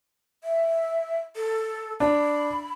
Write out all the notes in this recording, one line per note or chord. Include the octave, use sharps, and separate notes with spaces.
E5
A4
D4 B5